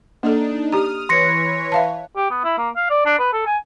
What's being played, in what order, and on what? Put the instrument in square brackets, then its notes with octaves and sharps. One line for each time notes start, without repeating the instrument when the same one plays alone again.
[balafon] A#3 A4 [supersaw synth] D4 D#4
[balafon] G4 A#5 [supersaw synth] D#6 F6
[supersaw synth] E3 B4 C#5 [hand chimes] C6 A#6 C#7
[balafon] E5 F5 A5
[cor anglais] G4
B3
E4
A#3
F5
D5
D4
B4
A4
G#5